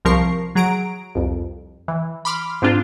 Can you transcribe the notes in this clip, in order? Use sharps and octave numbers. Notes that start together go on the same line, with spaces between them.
C2 F3 A#4 C#6 C7
F#3 G#4 A#5 D7
C2 F2
E3
B5 C6 D6 F6
G#2 C4 D4 F4